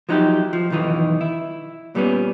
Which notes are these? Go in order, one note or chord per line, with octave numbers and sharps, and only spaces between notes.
F3 F#3 D#4 E4 G4
F3
B1 F2 D#3 E3 D#4
E4
A#2 G3 B3 C#4